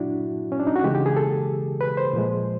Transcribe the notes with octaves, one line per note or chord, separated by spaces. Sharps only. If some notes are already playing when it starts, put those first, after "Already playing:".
Already playing: A#2 F#3 D4 E4 F#4
C#4
D4
D#4
F#4
C#3 E3 G#3 G4
G4
G#4
A4
B4
C5
A#2 F3 G#3